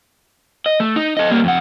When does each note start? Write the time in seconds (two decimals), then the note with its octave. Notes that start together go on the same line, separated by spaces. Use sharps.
0.66 D#5
0.80 A3
0.96 D#4
1.17 A4 D#5
1.30 G3 A#3
1.44 F2 F#5